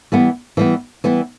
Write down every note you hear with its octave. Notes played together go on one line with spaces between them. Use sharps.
E3 G3 B3
E3 G3 B3
E3 G3 B3